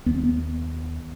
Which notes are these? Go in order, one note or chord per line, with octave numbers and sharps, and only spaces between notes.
D#2 B3
C4
B3